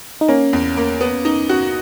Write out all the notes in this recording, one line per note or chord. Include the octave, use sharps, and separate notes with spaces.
D#4
A#3 C#4
E2
A#3
B3
D#4
F#4